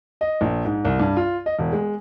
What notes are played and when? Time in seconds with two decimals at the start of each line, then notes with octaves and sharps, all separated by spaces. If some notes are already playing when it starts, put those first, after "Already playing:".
0.21 D#5
0.41 A#1
0.65 G#2
0.85 C2
0.99 G2
1.17 F4
1.46 D#5
1.58 E1
1.73 G#3